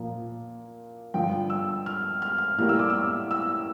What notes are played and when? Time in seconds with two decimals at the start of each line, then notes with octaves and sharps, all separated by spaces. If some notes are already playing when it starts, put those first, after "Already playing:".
Already playing: A#2 F3 A#3
1.14 G2 D3 F3 G5
1.50 E6
1.86 F6
2.22 F6
2.38 F6
2.58 A2 G3 A#3 F6
2.69 E6
2.79 D6
2.90 E6
3.31 E6